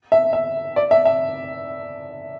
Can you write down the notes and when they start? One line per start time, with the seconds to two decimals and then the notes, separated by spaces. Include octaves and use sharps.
0.12 E5
0.33 E5
0.76 D5
0.91 E5
1.05 E5